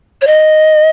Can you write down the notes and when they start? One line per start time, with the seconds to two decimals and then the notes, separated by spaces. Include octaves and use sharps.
0.21 C#5
0.27 D#5